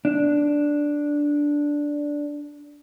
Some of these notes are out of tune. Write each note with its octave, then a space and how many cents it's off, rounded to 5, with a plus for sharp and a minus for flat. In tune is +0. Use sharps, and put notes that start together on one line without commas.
D4 -5